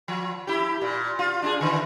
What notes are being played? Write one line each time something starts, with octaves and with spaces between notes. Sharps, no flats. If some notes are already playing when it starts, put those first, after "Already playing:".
F3
E4 G4
A#2
F4
D4 D#4 G#4
D3 E3